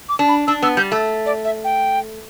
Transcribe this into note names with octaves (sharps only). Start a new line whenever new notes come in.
D6
D4
B5
D4 E6
B3 E6
G3 G6
A3 E6
D5
E5
G5